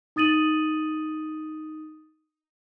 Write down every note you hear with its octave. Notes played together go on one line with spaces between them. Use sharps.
D#4 D#6 A6 D#7 F#7